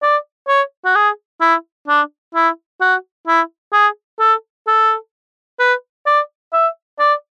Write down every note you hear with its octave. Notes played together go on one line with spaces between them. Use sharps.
D5
C#5
F#4
G#4
E4
D4
E4
F#4
E4
G#4
A4
A4
B4
D5
E5
D5